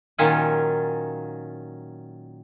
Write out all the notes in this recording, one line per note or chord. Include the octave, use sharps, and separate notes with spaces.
A#2 D#3 F#3 C#4 F4 G#5